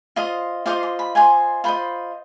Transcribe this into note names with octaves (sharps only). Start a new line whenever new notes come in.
F4 C5 D#5
F4 C5 D#5 D6
C6
B5
F4 C5 D#5 G#5
F4 C5 D#5 B5